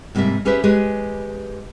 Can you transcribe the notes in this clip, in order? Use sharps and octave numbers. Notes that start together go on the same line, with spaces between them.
G#2 C3 G3 A#3 E5
C#4 G4 G#4 B4 C5 E5
G#3 G4 G#4 B4 C#5